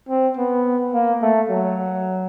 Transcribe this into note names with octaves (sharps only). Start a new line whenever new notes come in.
C4
B3
A#3
A3
F#3